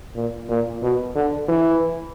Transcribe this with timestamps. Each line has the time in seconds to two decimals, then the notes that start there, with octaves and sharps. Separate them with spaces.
0.16 A#2
0.49 A#2
0.83 B2
1.16 D3
1.49 E3